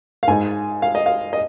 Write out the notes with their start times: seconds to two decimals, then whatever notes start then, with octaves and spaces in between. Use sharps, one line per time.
0.23 F5
0.28 G#2 G#3 D#4 G#5
0.82 F5
0.95 D#5
1.06 F5
1.33 D#5